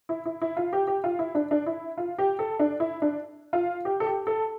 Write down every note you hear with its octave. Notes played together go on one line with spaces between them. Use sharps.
E4
E4
E4
F4
G4
G4
F4
E4
D4
D4
E4
F4
G4
A4
D4
E4
D4
F4
G4
A4
G4
A4